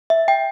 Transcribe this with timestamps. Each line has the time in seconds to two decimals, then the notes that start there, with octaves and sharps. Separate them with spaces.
0.10 E5
0.28 G5